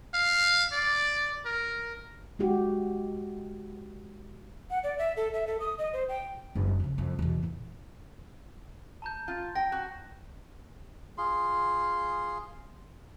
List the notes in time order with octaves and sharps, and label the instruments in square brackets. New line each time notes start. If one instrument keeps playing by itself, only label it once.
[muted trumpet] F5
D5
A#4
[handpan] G#3 D#4 F#4 G4
[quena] F#5
D5
E5
A4
E5
A4
D#6
D#5
C5
G5
[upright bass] F#1
F2 C#3
F2
E2 B2
A#2 E3
[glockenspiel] A5 A#5 G6
[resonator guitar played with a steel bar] F4
[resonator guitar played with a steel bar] G5 [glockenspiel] A#6
[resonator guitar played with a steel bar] F#4
[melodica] F4 G#4 C6